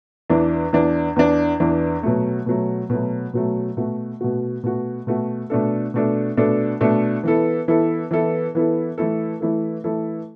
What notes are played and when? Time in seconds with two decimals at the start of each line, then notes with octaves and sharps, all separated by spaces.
0.30 E2 E3 D4
0.73 E2 E3 D4
1.16 E2 E3 D4
1.60 E2 E3 D4
2.03 B2 F#3 A3
2.46 B2 F#3 A3
2.90 B2 F#3 A3
3.33 B2 F#3 A3
3.77 B2 A3 F#4
4.21 B2 A3 F#4
4.63 B2 A3 F#4
5.07 B2 A3 F#4
5.50 B2 A3 D4 A4
5.94 B2 A3 D4 A4
6.37 B2 A3 D4 A4
6.80 B2 A3 D4 A4
7.24 E3 B3 E4 A4
7.68 E3 B3 E4 A4
8.11 E3 B3 E4 A4
8.55 E3 B3 E4 A4
8.98 E3 A3 E4 A4
9.40 E3 A3 E4 A4
9.84 E3 A3 E4 A4